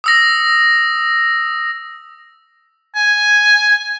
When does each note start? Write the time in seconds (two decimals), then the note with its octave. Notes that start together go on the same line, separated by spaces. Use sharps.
0.04 D#6 E6 A#6
2.95 G#5